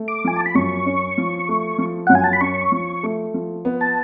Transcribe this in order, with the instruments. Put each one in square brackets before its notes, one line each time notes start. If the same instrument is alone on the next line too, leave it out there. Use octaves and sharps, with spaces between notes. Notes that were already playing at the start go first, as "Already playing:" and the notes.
Already playing: [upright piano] A3
[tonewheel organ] D6
[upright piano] F3 [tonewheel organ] G#5
[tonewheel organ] A5
B5
[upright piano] F#2 [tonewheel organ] C#6
[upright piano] C#4
F3
A3
F3
[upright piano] F#2 [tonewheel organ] F#5
[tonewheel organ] G#5
A5
B5
[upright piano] C#4 [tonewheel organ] C#6
[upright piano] F3
A3
F3
B3
[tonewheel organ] A5